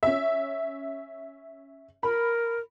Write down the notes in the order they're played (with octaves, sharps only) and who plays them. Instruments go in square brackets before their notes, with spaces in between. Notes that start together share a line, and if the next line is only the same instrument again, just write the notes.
[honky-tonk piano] C#4 E5
[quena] A#4 [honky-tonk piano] B5